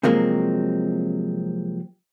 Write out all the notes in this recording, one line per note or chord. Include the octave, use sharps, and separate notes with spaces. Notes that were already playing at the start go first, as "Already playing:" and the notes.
C3 F3 F#3 G#3 A#3 C4